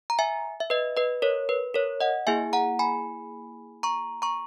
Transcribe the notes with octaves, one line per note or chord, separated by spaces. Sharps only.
A#5
E5 G#5
E5
B4 D#5
B4 D#5
A#4 C#5
B4
A#4 C#5
D#5 F#5
A#3 E4 G#4 E5 G#5
F#5 A#5
G#5 B5
A#5 C#6
A#5 C#6